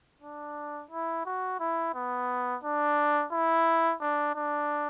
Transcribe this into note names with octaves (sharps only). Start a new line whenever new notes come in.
D4
E4
F#4
E4
B3
D4
E4
D4
D4